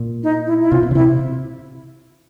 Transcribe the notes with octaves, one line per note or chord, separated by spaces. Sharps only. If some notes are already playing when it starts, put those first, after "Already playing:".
Already playing: A#2
D#4
E4
E4
C3 F4
B2
C#3
C3 E4